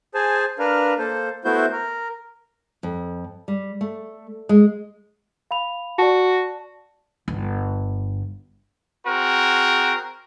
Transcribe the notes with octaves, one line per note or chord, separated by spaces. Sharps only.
G#4 C5 G#5 A5
D4 A#4 B4 F5
A#3 A4 C5
A3 B3 E4 F#4 C5 G6
A#4
F2
G3
A3
G#3
F5 B5 F7
F#4 D5 A5
G1
C4 F#4 G#4 A#4